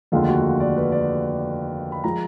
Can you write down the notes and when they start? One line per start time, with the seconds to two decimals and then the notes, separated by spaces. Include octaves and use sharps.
0.12 F1 D#2 D3 G#3 F4
0.28 F#4
0.60 D5
0.77 B4
0.92 D5
1.92 B5
2.04 F3 G#3 A#5